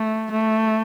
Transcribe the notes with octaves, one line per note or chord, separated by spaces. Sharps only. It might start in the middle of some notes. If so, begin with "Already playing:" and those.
Already playing: A3
A3